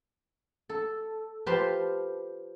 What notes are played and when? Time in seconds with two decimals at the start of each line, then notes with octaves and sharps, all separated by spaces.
0.69 A4
1.46 F3 G4 B4 F5 A5 C6